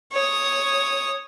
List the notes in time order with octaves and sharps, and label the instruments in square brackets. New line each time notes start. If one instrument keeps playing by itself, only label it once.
[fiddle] C#5 D#6